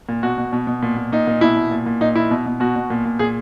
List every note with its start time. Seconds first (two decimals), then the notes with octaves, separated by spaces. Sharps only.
0.09 A#2
0.23 B2 F#4
0.38 B2
0.53 B2
0.67 B2
0.83 A#2
0.97 A#2
1.12 A#2 D#4
1.27 A#2
1.41 B2 E4
1.56 B2
1.71 A#2
1.86 A#2
2.01 A#2 D#4
2.15 A#2 E4
2.31 B2
2.46 B2
2.60 B2 F#4
2.76 B2
2.90 A#2
3.05 A#2
3.19 A#2 G#4